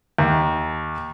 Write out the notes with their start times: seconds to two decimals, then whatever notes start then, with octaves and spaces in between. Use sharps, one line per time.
0.18 D#2